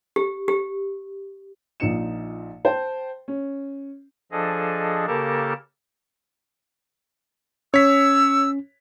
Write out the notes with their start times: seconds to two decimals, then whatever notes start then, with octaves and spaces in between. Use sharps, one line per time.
0.16 G4
0.48 G4
1.80 A#1 A#2 F3 D#4 C#7 E7
2.65 C5 G5 A5
3.28 C#4
4.32 F3 D4 G#4 A4 D#5
5.07 C#3 A#3 G4 A4 A#4 A5
7.74 C#4 C#5 E6 B6